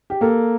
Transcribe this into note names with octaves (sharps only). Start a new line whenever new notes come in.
G4
A#3 A4